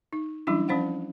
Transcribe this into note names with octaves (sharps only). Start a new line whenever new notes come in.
D#4
E3 F#3 G3 C#4 D4 E4
F3 C4 C#4 C5 F5 F#5